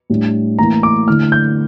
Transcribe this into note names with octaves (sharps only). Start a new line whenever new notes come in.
A2 G3 D4
A2 E3 A#3 E4 A#5
D6
D3 A3 E4 F6
G6